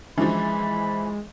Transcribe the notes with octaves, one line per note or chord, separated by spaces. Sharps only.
E3 F3 G#3 C#4 D4 F#4 B5